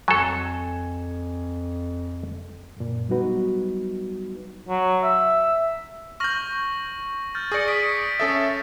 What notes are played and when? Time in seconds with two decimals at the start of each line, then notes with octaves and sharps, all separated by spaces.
0.08 F2 F#3 A4 G#5
2.77 F#2 A#2
3.09 F#3 G3 B3 D#4 F#4 B4
4.69 F#3
5.03 E5
6.20 C#6 F6 G6 A#6 F#7
7.35 F6 G6 A6
7.52 G#4 D5 C#6 A#6 C#7
7.68 D#6 B6 D7
8.20 C#4 A4 E5 D#6